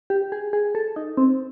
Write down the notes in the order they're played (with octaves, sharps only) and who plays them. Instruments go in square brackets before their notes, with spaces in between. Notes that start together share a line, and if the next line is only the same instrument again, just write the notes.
[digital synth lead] G4
G#4
G#4
A4
D#4
C4